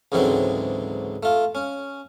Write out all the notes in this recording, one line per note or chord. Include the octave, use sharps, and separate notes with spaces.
C#2 G#2 D3 E3 F#3 C4
A3 F4
C#4